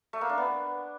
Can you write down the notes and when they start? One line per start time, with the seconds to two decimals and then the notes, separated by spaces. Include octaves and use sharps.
0.13 A3
0.21 A#3
0.29 D4
0.38 B3